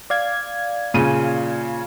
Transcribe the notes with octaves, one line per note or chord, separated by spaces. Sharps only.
D5 F5 G#6
A#2 C#3 D#7